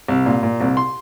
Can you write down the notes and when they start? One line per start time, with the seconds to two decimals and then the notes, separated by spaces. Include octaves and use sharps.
0.08 C2
0.26 A#2
0.43 A#2
0.61 C2
0.77 C6